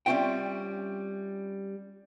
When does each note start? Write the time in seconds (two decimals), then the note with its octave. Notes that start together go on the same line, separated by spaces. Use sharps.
0.06 G3 C4 C#4 F4 E5 G5